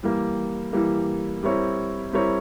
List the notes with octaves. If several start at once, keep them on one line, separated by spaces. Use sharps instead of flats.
E3 G3 A#3
E3 G3 A#3
G3 C4 E4 A#4 C#5
G3 C4 E4 A#4 C#5